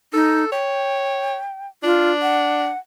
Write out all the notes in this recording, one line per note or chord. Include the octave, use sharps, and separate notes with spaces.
D#4 A4
C#5 G5
D4 F4
F#5